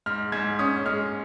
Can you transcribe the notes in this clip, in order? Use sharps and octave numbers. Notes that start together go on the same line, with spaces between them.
G#2 F6
G#2 G#6
C#4 D#6
G#3 F6